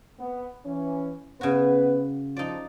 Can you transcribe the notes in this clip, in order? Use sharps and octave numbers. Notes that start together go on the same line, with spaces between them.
B3
E3 C#4
C#3 B3 F#4 B4
F3 D#4 D5